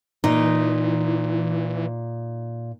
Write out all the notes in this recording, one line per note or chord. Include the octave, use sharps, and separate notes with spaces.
A#2 E3 D#4